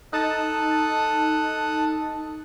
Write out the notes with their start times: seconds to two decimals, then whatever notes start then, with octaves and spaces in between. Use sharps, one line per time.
0.13 D#4 A4 A5 D#6 F#6